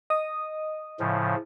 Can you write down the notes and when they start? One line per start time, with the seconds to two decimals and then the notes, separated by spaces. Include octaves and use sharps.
0.10 D#5 D#6
1.00 A2 C#3 F3